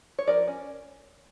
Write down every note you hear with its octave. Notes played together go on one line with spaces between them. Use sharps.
C#5
F3 A#4 D5
C#4